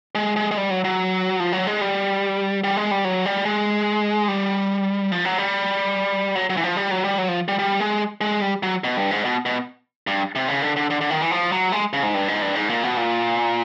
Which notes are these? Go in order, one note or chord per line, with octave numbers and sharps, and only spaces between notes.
G#3
G#3
G#3
G3
F#3
F#3
F3
F#3
G#3
G3
G3
G#3
G3
F#3
G3
G#3
G3
F3
F#3
G3
F#3
F#3
E3
F3
G3
F#3
G3
F#3
F3
G3
G3
G#3
G#3
G3
F#3
B2
G2
G#2
B2
B2
G2
C3
C#3
D3
D3
D3
D3
D#3
E3
F3
F#3
G#3
C#3
G#2
G2
G#2
G2
G#2
A#2
B2
A#2